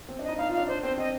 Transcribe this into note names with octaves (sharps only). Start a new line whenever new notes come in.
C4
D4
D#4 D#5
D#4 F5
F4
D4 F5
D4 C5
C4 C5
C4 D#5